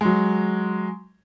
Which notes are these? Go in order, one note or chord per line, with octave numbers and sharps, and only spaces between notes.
F#3 G#3